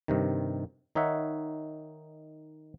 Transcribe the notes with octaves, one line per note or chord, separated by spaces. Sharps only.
G2 C3 D#3
D#3 D#4 C#5 E5 F#5